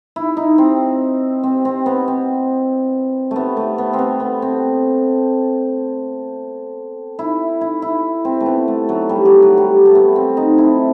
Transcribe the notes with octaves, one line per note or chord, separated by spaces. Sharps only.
E4
D#4
C4
C4
C4
B3
C4
A3 B3
A3
B3
C4
B3
B3
C4
E4
E4
E4
C4
A3
B3
A3
F#3
G3
F#3
F#3
G3
A3
B3
C4
D#4
E4